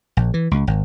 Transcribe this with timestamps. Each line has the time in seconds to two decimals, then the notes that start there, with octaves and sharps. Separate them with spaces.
0.17 A#1
0.34 E3
0.51 C#2
0.67 G#1